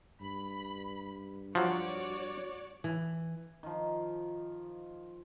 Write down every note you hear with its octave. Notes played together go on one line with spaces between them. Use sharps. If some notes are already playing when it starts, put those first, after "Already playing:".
G2 B5
F3 F#3 F#4 C#5 D5
E3
D#3 F3